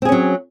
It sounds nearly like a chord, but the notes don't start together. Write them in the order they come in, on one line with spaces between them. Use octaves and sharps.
C4 G#4 C#4 F#3